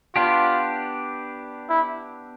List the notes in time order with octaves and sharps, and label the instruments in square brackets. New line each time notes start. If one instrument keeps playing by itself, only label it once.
[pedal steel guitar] B3 D4 G4 [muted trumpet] F4
[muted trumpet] E4